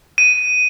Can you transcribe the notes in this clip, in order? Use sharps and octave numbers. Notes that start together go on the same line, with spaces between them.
D#7